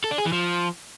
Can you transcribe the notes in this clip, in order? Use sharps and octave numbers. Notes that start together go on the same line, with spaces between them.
A4
D4
G#4
E3
F3